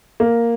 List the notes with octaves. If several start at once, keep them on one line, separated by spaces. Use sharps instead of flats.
A#3